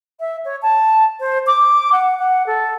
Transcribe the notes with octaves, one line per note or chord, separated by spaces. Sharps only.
E5
C#5
A5
C5
D6
F#5
F#5
A4